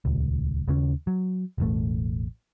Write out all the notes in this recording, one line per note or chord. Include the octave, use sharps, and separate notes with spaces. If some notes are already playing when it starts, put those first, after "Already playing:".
D#1 C#2
D#2 C#3 C#4
F#3
E1 A1 A3